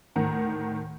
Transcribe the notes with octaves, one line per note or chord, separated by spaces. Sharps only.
D2 A2 D#3 F#5 A#5